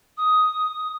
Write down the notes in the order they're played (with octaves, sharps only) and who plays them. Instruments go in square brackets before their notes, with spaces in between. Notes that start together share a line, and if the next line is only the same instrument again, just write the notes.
[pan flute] D#6